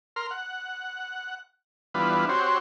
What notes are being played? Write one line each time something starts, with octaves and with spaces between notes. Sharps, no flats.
A#4 C6 F6
F#5
E3 G3 B3 D4 F4 B4
C4 F#4 G4 C5 C#5